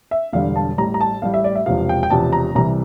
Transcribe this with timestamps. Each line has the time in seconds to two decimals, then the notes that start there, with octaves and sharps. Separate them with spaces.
0.11 E5
0.33 E1 E2 D3 G3 F5
0.56 A5
0.78 A1 A2 G3 A#5
0.94 A#5
1.00 A5
1.22 A1 A2 G3 F5
1.34 E5
1.44 D5
1.55 E5
1.66 E1 E2 C3 F3 F5
1.89 G5
2.03 G5
2.10 E1 E2 C3 F3 A5
2.33 A#5
2.55 C2 C3 E3 G3 A#5